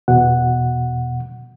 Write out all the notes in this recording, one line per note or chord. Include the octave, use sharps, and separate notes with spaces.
E2 B2 F#5